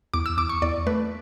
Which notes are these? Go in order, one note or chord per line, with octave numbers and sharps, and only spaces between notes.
E2 D6
E6
E2 D6
C#6
E2 D5
A3 B4